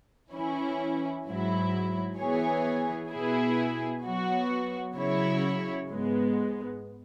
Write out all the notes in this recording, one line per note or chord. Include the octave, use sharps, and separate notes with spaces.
E3 C#4 E4
G#2 F#3 E4
E3 B3 G#4 C#5
B2 B3 E4 G#4
F#3 B3 F#4
C#3 F#3 E4 C#5
G#2 G#3 B3